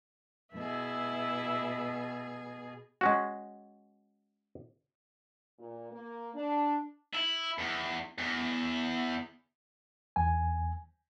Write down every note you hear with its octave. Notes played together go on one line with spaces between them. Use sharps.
B2 E4 G#4 E5
G#3 C#4 F#4
A#2
A#3
D4
E4
E2
E2
E2 G#5